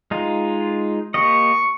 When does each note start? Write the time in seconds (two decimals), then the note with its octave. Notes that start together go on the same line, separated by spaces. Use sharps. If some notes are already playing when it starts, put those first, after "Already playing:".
0.11 G#3 D#4 F4
1.14 A#3 G4 D#5 C#6